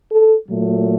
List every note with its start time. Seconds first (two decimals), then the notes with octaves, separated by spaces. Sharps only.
0.09 A4
0.48 A#2 F#3 A3